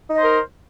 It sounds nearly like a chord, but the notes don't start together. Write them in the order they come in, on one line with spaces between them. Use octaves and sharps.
D#4 D#5 C5 A#4